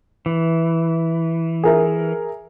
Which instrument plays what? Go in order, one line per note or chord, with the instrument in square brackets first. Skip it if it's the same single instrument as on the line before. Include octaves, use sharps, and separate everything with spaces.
[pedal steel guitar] E3
[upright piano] G#4 A#4 E5